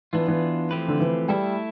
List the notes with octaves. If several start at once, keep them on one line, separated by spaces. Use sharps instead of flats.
E3 B3 D4 F4
E3
F3 A3 C4 G4 B4
D3
E3
G3 A3 E4 A4